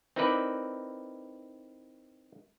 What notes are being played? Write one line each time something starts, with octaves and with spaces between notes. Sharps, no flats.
C4 D#4 E4 A#4 B4 D5